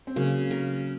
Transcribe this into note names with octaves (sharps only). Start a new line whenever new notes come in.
C4
C#3 F#3 A#3
A#4